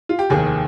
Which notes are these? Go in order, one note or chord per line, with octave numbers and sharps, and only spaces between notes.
F4
G4
F1 D#2 D#3 G#4